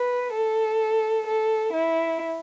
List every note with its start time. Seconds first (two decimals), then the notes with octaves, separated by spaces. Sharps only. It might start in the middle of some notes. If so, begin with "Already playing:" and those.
Already playing: B4
0.34 A4
1.27 A4
1.73 E4